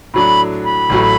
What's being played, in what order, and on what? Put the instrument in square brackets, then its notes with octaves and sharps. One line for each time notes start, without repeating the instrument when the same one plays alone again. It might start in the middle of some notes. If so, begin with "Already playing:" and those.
[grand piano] A2 F#3 D4 [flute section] B5
[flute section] B5
[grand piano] A1 A2 F#3